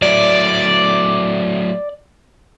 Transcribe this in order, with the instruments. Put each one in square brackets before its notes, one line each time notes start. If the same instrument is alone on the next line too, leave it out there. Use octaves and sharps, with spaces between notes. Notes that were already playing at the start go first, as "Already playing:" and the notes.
[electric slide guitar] F#3 A3 E4 [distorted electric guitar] D5